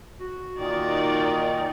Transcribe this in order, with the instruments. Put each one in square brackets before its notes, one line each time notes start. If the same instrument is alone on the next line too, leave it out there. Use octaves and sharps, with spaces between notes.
[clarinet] F#4
[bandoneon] A#2 D#3 [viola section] D#4 [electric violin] A#4 D5